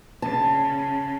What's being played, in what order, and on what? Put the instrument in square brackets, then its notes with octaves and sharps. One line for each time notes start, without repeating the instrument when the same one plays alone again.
[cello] C#3 [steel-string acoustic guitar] A5